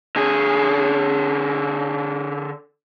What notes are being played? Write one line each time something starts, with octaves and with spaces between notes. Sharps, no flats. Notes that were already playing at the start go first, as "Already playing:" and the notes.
D3 G#4